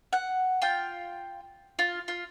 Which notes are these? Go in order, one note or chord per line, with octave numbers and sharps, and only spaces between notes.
F#5
F4 G5
F4
F4